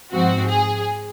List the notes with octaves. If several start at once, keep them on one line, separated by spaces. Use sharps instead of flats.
G#2 F3 C4 F#4
G#4